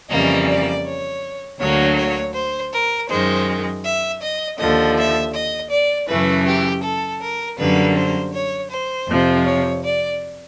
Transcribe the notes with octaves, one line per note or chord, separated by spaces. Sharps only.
F2 C#3 E3 G3 A#3 D#5
D5
C#5
D2 D3 F#3 A#3 C#5
C#5
C5
A#4
F#2 D#3 G#3 C5
E5
D#5
D#2 D3 F3 D#5
E5
D#5
D5
F#2 C#3 E3 A3 B4
G4
A4
A#4
F#2 D3 G3 A#3 B4
C5
C#5
C5
F2 C3 F3
C#5
D5